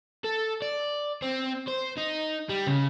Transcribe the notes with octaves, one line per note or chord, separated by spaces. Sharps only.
A4
D5
C4
C5
D#4
G3
C#3